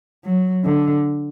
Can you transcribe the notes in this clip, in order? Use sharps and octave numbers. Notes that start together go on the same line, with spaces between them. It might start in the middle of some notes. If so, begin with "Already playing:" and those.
F#3
D3